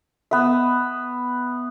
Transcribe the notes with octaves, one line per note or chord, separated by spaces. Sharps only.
B3 E5